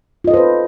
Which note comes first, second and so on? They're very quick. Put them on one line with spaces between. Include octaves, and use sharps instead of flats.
F4 D#5 A4 C5 B4